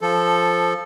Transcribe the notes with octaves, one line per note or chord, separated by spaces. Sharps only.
F3 A4